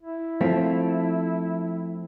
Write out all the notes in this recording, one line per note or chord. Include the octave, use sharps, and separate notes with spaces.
E4
F3 A3 C4